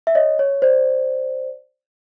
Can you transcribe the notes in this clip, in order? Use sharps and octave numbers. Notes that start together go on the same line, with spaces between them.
E5
C#5 D#5
C#5
C5 D5